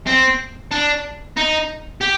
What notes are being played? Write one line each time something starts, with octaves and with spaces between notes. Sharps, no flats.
C4
D4
D#4
G4